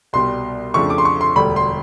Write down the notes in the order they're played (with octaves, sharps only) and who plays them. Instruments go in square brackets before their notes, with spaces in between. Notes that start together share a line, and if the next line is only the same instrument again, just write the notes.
[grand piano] C2 B2 G3 C6
F2 C#3 F3 A3 D4 C#6
D6
C6
C#6
C6
E1 D2 D3 G3 B5
C6